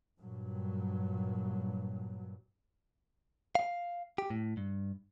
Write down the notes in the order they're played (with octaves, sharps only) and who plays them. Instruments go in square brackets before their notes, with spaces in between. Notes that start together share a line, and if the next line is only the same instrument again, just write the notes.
[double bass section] G2 A#2 F#3
[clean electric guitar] F5
G4
A2
G2